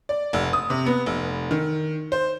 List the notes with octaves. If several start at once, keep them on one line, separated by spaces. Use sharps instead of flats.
D5
F1
D#6
C3
B3
F1
D#3
C5